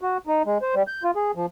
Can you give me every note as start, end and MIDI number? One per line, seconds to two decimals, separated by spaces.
0.01 0.17 66
0.27 0.42 63
0.46 0.58 56
0.62 0.75 72
0.75 0.83 55
0.87 1.03 91
1.03 1.11 65
1.16 1.31 68
1.35 1.46 53